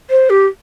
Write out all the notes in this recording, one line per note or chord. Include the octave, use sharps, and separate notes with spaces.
C5
G4